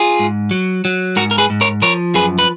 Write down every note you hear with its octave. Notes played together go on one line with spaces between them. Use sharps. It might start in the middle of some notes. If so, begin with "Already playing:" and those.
Already playing: F4 G#4
G#2
F#3
F#3
G#2 F#4 A#4
A#4
G#4 B4
G#2
A#4 C#5
F3 A#4 C#5
F#2 G#4 B4
B4